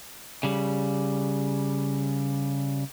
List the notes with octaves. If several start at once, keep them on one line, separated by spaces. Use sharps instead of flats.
C#3 G3